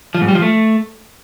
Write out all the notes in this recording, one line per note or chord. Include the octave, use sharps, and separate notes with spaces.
F3
G#2
G3
F3
A3